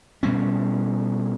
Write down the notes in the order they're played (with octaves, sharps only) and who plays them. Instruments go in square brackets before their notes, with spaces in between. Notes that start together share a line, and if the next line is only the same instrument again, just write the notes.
[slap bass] B2 G3 C4 C#4